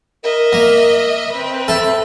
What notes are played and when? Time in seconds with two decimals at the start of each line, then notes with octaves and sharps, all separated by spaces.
0.24 A#4 D#5 E5
0.53 A#3
1.32 C4 B4
1.68 A4 E5